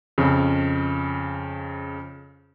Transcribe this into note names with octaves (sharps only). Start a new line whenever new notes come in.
F2 C#3